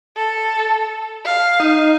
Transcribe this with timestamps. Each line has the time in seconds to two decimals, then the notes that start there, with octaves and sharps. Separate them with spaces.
0.17 A4
1.25 F5
1.60 D#4